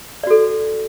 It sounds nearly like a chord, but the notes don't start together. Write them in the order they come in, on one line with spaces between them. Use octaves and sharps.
D5 F#4 A4